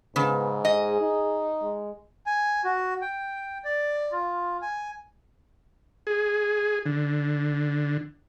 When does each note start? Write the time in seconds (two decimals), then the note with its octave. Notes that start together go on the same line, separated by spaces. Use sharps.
0.16 G#2 C#3 B3
0.65 G#4 D#5
1.01 D#4
1.62 G#3
2.26 G#5
2.64 F#4
3.02 G5
3.65 D5
4.12 F4
4.62 G#5
6.07 G#4
6.86 D3